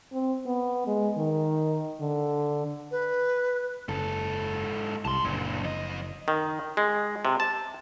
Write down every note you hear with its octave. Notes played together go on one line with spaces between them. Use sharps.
C4
B3
G#3
D#3
D3
B4
F#1 G#2 A4
C2 A5 C6
F#1 A#2 D3
F2 D#5
D#3
G#3
C3
A5